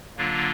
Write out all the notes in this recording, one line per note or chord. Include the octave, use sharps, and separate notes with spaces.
D3 F#3 A#3 D4 F4